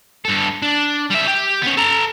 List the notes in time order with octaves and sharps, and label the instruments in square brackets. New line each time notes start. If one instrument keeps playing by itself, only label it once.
[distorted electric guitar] G2 A4
D4
G3 E5
G4
B3 C#4
A4 A#5